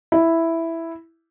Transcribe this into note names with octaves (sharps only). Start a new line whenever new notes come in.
E4